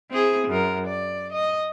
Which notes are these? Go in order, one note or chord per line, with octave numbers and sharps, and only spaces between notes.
C4 E4 G#4
F#2 A#4
D5
D#5